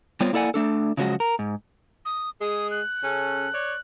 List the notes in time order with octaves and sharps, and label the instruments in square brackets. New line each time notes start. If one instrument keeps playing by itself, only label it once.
[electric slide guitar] G3 B3 C4 F4 C#5
A#3 E4 A4 D5 F#5 G#5
A3 D4 A4
C#3 F3 F#3 G#3 F#4
A#4
G#2
[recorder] D#6
[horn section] G#3 G#4 [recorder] D#6
[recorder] F#6
[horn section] C#3 C#4 A4
C#5 D5